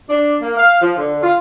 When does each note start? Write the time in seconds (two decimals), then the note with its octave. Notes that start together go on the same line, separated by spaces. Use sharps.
0.10 D4
0.42 A#3
0.57 F5
0.81 F3
0.97 D3
1.22 F4